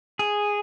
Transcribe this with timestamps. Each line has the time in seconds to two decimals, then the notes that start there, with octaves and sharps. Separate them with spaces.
0.19 G#4